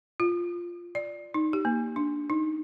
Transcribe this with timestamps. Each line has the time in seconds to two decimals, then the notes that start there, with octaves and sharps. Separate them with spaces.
0.20 F4
0.95 D5
1.34 D#4
1.53 G4
1.65 A#3
1.96 D4
2.30 D#4